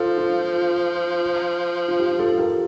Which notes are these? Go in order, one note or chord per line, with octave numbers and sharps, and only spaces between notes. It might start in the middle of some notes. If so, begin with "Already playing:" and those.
Already playing: F3 F4 A4
F4
F4
G4
F4 A4
G4 A#4